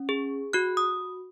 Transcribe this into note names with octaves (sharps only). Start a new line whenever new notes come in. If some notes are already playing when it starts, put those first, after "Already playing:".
Already playing: C#4
G#4
F#4 F#6
D#6